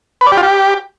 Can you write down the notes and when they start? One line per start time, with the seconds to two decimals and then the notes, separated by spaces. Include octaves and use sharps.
0.21 B4
0.27 D5
0.32 G4
0.37 F4
0.43 G4